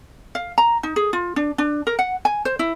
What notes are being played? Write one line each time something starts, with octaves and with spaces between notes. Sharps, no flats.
F5
A#5
D#4
G#4
F4
D4
D4
A#4
F#5
G#5
C5
E4